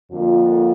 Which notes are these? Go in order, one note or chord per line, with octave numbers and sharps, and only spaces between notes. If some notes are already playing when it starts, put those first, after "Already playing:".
F2 D3 F3 A#3 F4